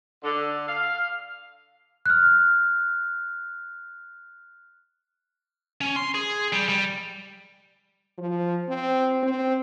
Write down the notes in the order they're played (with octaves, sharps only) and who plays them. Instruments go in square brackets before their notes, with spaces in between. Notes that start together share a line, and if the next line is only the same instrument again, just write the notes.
[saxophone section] D3
F5
[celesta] F6 F#6
[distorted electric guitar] C#4
C6
G#4
G3
G3
[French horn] F3
C4
C4